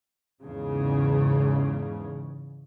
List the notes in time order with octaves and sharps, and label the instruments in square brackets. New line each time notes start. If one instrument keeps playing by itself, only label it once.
[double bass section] E2 G#2 C#3